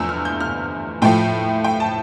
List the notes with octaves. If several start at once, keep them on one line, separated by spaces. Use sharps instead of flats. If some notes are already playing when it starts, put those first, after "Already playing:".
Already playing: E2 D3 F3 A3 E6
F6
G6
F6
A2 F3 A3 G5
G5
A5